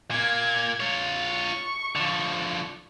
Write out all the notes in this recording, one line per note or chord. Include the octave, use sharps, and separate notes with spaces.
A#2 A#3 G#6
F4 C#5
C#6
D3 F3